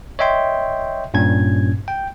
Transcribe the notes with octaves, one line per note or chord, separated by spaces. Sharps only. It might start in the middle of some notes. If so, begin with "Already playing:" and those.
C#5 D#5 E5 G5 C6
G2 A#2 C#4 G#6
G5